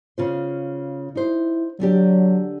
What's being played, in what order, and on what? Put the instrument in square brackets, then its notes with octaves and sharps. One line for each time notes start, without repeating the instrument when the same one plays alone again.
[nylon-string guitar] C#3 F4 C5
[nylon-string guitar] D#4 C5 [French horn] E4
[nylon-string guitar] D3 D4 G4 [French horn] F#3